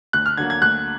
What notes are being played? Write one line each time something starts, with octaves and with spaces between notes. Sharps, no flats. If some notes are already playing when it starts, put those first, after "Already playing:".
D2 F#6
F6
D3 F#3 A#3 G#6
G#6
D2 F#6